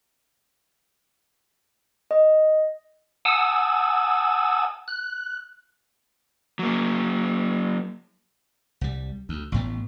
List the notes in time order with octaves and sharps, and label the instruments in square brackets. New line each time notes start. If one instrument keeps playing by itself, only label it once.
[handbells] D#5
[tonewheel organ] F#5 G#5 A5 D#6 E6
F#6
[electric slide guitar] F#3 A#3
[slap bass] C2 G3
D2
A1 A2 B3